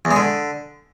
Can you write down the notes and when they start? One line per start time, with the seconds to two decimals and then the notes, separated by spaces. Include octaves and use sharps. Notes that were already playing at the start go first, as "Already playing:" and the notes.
0.05 E2
0.11 G#3
0.16 D3